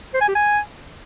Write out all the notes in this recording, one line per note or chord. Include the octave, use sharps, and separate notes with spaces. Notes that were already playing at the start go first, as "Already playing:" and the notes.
C5
G#5
G4
G#5